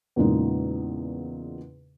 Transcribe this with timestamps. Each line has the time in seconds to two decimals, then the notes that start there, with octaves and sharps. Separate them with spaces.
0.16 E2 A#2 C#3 G#3 D#4